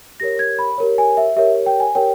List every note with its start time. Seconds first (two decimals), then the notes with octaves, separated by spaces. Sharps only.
0.20 G4 A#4 C#5 A#6
0.39 G#6
0.59 B5
0.78 G4 A#4 C#5
0.98 G#5
1.17 E5
1.36 G4 A#4 C#5 E5
1.66 G5
1.80 G#5
1.95 G4 A#4 C#5 G5